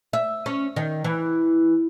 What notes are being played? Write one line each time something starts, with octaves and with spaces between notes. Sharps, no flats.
E5
C#4
D#3
E3